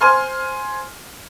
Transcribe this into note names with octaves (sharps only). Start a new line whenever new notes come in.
C5 G#5 C6 F6